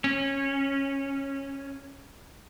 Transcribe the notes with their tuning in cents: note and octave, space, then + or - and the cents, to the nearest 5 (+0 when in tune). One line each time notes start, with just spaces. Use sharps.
C#4 -15